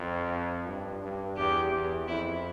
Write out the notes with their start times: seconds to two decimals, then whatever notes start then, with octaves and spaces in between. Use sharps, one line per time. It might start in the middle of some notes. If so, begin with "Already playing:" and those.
Already playing: F2
0.66 G2
1.02 G2
1.37 E2 G4
1.73 E2
2.08 F2 E4